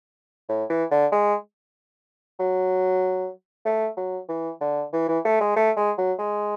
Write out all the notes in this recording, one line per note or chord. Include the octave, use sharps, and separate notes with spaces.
A2
E3
D3
G#3
F#3
A3
F#3
E3
D3
E3
E3
A3
G#3
A3
G#3
F#3
G#3